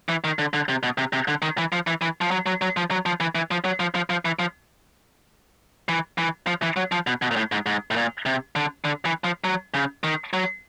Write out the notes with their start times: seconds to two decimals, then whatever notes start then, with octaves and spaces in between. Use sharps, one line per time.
0.09 E3
0.24 D#3
0.39 D3
0.54 D3
0.69 C3
0.83 B2
0.98 C3
1.13 C3
1.28 D3
1.42 D#3
1.58 E3
1.72 F3
1.87 E3
2.02 E3
2.21 F3
2.31 F#3
2.46 F#3
2.62 F#3
2.77 F3
2.91 F#3
3.06 F3
3.20 E3
3.35 E3
3.51 F3
3.65 F#3
3.80 F3
3.95 F3
4.10 F3
4.25 E3
4.39 F3
5.89 E3
6.18 E3
6.47 F3
6.63 E3
6.76 F#3
6.92 F3
7.07 B2
7.22 B2
7.31 A#2
7.36 A2
7.52 G#2
7.66 G#2
7.91 A2
7.96 A#2
8.26 C3
8.56 D3
8.85 D3
9.05 E3
9.24 F3
9.44 F#3
9.74 C#3
10.04 D#3
10.33 F#3